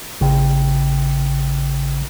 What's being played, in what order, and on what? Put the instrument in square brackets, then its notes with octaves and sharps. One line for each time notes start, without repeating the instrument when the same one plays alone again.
[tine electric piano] A1 C#3 G5